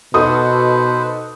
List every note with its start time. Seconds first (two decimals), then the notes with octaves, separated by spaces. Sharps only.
0.14 B2 D#4 F#4 A4 B4 C5 D#6